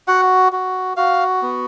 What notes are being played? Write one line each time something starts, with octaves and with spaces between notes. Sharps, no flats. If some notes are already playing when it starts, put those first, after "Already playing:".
F#4 F#5
F#4
F#4 F5
B3